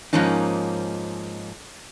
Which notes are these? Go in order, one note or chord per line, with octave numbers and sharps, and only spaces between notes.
G#2 F3 A#3 C#4 D#4